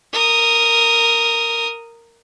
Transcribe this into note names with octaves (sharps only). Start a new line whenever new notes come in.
A#4 D#6